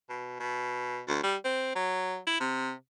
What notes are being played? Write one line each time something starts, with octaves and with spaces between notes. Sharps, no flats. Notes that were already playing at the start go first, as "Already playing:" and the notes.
B2
B2
D2
G3
C4
F#3
E4
C3